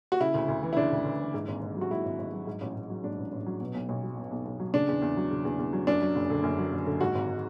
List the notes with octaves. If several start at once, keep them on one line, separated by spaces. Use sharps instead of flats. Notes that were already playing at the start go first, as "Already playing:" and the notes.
F#4
C#3 E4
D2
D2
E3
E4
C#3 D4
D2
D2
E3
G#2
G#1
G#1
F#3
F#4
G#2 E4
G#1
G#1
F#3
G#2
A1
A1
F#3
G#2 D4
A1
A1
F#3
B2
B1
B1
F#3
B2
B1
B1
F#3
C#3 D4
E2
E2
F#3
C#3
E2
E2
F#3
F#2 D4
F#3
F#1
D3
F#2
F#3
F#1
D3
G#2 F#4
G#1